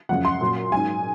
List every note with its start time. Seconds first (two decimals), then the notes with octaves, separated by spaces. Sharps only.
0.09 F#2 C#3 F3 F#5
0.25 C6
0.41 A#2 F#3
0.72 G#2 F#3 G#5